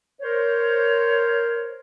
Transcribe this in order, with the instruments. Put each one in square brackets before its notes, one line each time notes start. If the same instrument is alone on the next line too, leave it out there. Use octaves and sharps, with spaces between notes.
[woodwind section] A#4 C5 C#5